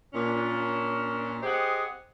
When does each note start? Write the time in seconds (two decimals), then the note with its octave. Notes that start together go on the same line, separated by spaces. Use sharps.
0.14 A#2 C#4 D4
1.43 C4 G4 G#4 C5 D#5 F#5